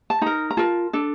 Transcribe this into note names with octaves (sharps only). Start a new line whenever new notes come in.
A5
D#4 A#4 A#5
A#5
F4 A#4 A5
D4 A4